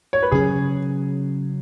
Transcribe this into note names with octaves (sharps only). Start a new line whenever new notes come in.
C#5
B4
C#3 F#3 C#4 G#4